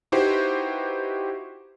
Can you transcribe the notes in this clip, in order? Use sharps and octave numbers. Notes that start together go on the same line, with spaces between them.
D#4 E4 F#4 G4 B4 C5